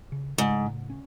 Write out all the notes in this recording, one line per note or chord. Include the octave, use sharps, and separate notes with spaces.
C#3
G#2 C#3
A2
C#4